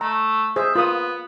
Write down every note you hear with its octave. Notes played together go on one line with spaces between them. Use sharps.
A3 A#5
G#4 C5 E5
B3 F4 A#4 D#6